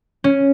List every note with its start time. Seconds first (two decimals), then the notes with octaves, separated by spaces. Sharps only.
0.24 C#4